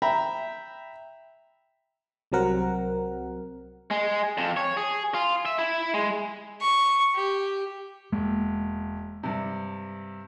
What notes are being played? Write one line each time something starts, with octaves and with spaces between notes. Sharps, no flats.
E5 G5 A#5 B5
C2 C3 F#3 C4 A#4 F#5
G#3
F2
C#5
G#4
F4
E5
E4
G#3
C#6
G4
E1 G#3 A#3
G2 C3